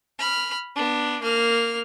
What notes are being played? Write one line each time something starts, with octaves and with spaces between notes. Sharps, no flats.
B5 F6
B3 D4
A#3 F6